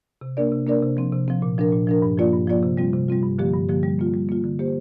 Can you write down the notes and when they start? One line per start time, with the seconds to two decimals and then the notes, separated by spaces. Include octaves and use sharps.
0.21 C3
0.37 A#3 D4 A#4 D5
0.52 C3
0.67 A#3 D4 A#4 D5
0.82 C3
0.97 F3 C4
1.13 C3
1.28 F3 C4
1.42 A#2
1.58 F3 D4 A#4
1.73 A#2
1.87 F3 D4 A#4
2.02 G2
2.17 F3 A#3 F4 D5
2.33 G2
2.47 F3 A#3 F4 D5
2.63 C3
2.77 G3 C4 F4
2.93 C3
3.08 G3 C4 F4
3.23 G2
3.39 D3 F3 A#3 G4
3.53 G2
3.69 D3 F3 A#3 G4
3.83 G3
3.99 A#3 F4
4.14 G3
4.29 A#3 F4
4.44 D3
4.59 A#3 G4 C5